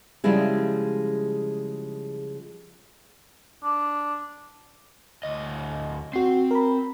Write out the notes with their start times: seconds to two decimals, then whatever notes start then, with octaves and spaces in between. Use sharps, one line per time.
0.24 C#3 F3 G3 G#3 E4 G#4
3.64 D4
5.23 D2 D#5
6.13 C4 F#4 C7
6.51 A#4 B5